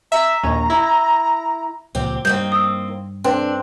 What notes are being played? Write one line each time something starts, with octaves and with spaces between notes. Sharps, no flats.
E5 A#5
A#1 D#2 C#4
E4
C#2 A#2 F3 C4 G4
G2 D#3 G3 A#3 C4 G6
D#6 E6
C4 D4 B4